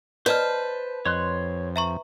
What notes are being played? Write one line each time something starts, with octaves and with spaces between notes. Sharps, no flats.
B4 C5 D5 D#5 A5 F6
F2 C#5 D#5 C6 F#6
E5 A#5 C#6